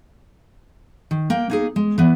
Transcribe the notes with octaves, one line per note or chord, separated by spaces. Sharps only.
D#3
A#3 G5
A#3 D#4 G#4
G#3
E3 B3